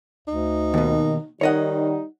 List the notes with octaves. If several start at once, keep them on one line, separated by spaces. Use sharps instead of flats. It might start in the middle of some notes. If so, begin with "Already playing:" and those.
D2 D#4
D#2 B2 D#3
D#3 G3 D#4 C#5 D#5 F#5